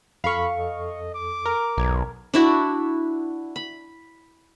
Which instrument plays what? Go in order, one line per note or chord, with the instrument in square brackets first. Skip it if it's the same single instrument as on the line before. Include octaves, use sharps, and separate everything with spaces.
[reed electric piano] F2 A4 [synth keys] F5 C#6 [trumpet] B5
[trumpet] D#5
D6
[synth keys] A#4
[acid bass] B1 [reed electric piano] E2 A#5 G#6
[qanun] D4 E4 F#4
B5